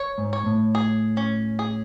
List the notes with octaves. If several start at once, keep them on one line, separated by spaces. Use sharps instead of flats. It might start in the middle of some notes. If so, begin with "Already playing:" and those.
Already playing: C#5
G#2
C#5
A2
G#4
C#4
G#4